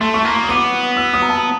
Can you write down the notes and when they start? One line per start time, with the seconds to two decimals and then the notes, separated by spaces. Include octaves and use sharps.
0.01 A3 C6
0.14 C#6
0.25 A#3 C6
0.43 D#6
0.49 B3 D6
0.97 E6
1.14 D#6
1.22 A#5
1.29 A5